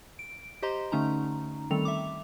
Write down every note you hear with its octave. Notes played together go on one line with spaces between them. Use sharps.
D7
G4 C5 D#5 A#5 C6
D3 A3 C#4 D#4 A#5
D#3 G3 A3 C4 A4 F7
E5 D6